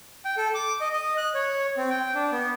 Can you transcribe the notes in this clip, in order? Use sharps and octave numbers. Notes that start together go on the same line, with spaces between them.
G5
A4
D6
D#5
D#5
F#6
C#5
C4
G5
D4
B3